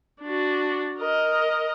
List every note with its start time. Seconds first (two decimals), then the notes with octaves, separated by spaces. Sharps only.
0.22 D4 F#4
0.99 A#4 D#5